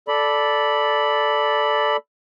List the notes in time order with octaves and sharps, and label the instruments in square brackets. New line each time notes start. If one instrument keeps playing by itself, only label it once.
[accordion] A4 D5 B5